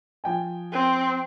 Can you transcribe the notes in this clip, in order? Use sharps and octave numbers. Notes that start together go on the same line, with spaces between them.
F3 G5 G#5
C4